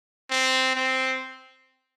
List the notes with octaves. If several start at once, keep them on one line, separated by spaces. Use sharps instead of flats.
C4
C4